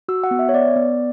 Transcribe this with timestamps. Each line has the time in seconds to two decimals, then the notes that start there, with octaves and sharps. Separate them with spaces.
0.08 F#4 E6
0.24 F#5
0.31 B3
0.39 E5
0.49 C#5
0.53 B3 D5
0.76 B3